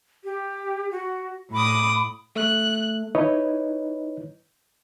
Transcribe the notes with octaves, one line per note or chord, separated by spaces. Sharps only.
G4
F#4
A2 B5 D6 D#6
A3 F#6
D#4 E4 B4 C#5 D#5